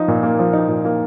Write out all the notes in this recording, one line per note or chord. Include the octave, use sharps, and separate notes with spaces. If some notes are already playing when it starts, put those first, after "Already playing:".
Already playing: F3 D#4
A#2
A#3
F3
D#4
A#2
A#3